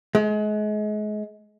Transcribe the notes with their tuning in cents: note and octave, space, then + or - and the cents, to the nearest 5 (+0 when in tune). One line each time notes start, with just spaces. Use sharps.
G#3 +35